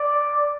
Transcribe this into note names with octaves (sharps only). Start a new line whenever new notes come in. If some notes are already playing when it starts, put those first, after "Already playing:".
Already playing: D5